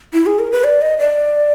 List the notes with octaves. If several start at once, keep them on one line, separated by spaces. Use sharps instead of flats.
E4
G#4
A#4
B4
D5
D#5
D5